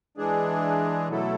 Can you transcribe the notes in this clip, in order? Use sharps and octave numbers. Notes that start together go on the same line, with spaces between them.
E3 G#3 D4 G#4
B2 F#3 A3 E4 A4